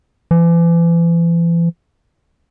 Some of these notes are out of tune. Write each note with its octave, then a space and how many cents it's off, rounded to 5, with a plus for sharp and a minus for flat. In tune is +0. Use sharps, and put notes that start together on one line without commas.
E3 +40